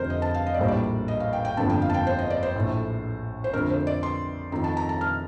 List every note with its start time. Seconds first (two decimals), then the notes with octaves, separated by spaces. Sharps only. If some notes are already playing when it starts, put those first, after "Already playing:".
Already playing: F1 F2 D3 A#4 C5
0.10 D#5
0.22 A5
0.34 F5
0.46 D#5
0.54 D5
0.59 A#1 A2 G3 A#3 C5
0.68 D5
1.08 D#5
1.20 F5
1.33 G5
1.45 G5
1.57 G1 F2 D3 F3 A#3 A5
1.70 G5
1.82 F5
1.90 A5
1.94 G5
2.07 C5
2.19 D#5
2.30 D5
2.43 C5
2.56 A#1 A2 A3
3.44 C5
3.53 F2 D3 A3 A#4
3.70 C5
3.87 D5
4.03 C6
4.52 F2 D#3 A3 A#5
4.64 A5
4.77 A#5
4.89 A5
5.01 F6